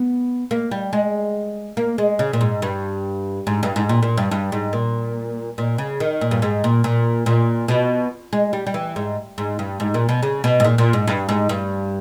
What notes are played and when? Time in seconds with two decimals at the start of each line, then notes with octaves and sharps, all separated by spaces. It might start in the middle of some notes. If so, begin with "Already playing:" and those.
Already playing: B3
0.51 A#3
0.71 G3
0.93 G#3
1.77 A#3
1.98 G#3
2.19 C#3
2.33 A#2
2.41 G#2
2.62 G2
3.47 G#2
3.63 G2
3.76 G#2
3.89 A#2
4.03 A#2
4.17 G2
4.31 G2
4.52 G#2
4.73 A#2
5.58 A#2
5.78 C#3
6.00 D#3
6.21 A#2
6.31 G2
6.42 G#2
6.64 A#2
6.84 A#2
7.26 A#2
7.68 B2
8.33 G#3
8.53 G3
8.67 G3
8.74 E3
8.96 G#2
9.38 G#2
9.59 G2
9.80 G#2
9.94 A#2
10.09 B2
10.23 C#3
10.44 B2
10.60 G#2
10.64 A#2
10.78 A#2
10.93 G#2
11.07 G2
11.29 G#2
11.49 G2